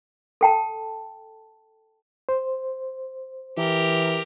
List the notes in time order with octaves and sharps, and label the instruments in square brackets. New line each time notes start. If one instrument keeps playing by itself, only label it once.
[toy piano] A4 G5 A5
[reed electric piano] C5
[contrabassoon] E3 [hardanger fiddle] G4 A#4